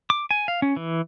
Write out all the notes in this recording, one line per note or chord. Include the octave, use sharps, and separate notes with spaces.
D6
G#5
F5
C#4
E3